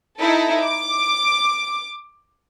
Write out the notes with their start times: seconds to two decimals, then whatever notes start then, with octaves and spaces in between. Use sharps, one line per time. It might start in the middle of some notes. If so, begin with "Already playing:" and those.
0.19 D#4 E4 A4
0.62 D6